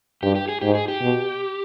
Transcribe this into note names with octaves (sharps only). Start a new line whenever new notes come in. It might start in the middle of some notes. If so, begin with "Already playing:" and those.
G2 G4
G4
G#4
G#2 G4
G#4
G4
B2